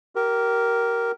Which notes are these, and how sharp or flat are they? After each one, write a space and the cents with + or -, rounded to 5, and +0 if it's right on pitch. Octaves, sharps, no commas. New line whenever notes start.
G4 -25 A#4 +0